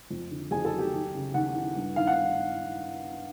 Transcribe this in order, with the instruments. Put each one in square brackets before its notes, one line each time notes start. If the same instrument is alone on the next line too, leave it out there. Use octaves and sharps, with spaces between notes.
[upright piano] F2
D3
F2 G#4 G#5
A4 A5
F#3
G4 G5
D#2
C#3
D#2 F#5
E3
G2
D#3 F5
F#5